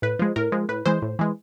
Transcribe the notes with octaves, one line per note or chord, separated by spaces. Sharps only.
A2 B4
F3 G#3
A2 A#4
F3 G#3
A2 B4
E3 G#3 C5
A2
E3 G#3